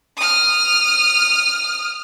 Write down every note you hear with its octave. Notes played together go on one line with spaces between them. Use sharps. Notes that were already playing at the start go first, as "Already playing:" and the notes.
D#6 F6